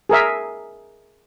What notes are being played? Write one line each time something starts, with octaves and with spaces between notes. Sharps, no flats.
G#4 A#4 E5